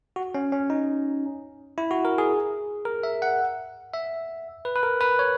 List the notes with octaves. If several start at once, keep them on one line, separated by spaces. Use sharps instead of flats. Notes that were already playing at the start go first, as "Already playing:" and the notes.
F#4
C#4
C#4
D#4
E4
F#4
A#4
G#4
A#4
E5
F#5
E5
B4
B4
A#4
B4
C#5